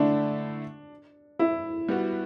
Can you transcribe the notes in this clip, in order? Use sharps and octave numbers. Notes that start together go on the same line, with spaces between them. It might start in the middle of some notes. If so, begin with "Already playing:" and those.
Already playing: D3 A3 D4 E4
E4
G3 B3 F#4